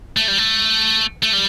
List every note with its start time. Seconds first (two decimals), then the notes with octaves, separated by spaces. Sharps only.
0.17 A3
0.28 G3
0.38 A3
1.23 A3
1.33 G3